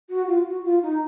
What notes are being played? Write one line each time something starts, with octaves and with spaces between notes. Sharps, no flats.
F#4
F4
F#4
F4
D#4